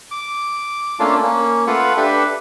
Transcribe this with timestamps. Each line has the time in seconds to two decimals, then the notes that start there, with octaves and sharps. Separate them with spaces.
0.11 D6
0.99 A3 A#3 C#4 D4 F4
1.23 A#3 C#4
1.67 A3 F4 B4 F#5
1.97 D4 G4 A4 B4 E5